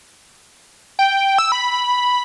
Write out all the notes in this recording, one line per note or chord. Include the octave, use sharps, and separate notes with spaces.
G5
E6
B5